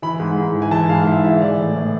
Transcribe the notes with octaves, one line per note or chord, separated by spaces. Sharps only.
E3 B5
G#2
G#2
E3
G#5
E3 A5
G#2 F5
G#2 E5
E3 E5
E3 D5
A2
A2